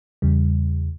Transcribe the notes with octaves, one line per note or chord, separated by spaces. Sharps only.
E2 C#3 G3